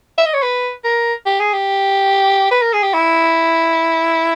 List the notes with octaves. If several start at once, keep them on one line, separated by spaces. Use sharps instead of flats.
E5
D#5
C#5
B4
A#4
G4
G#4
G4
B4
A#4
G#4
G4
E4